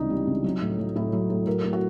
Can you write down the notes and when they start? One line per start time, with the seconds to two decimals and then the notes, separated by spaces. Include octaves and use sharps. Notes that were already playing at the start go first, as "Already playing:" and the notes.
Already playing: C#2 C3 E3 G3 D4 D#4
0.10 G3
0.27 C#2
0.44 F#3
0.61 A2
0.79 F#3
0.96 A2 E4
1.13 F#3
1.30 A2
1.47 F#3 A#4
1.64 A2
1.73 F#4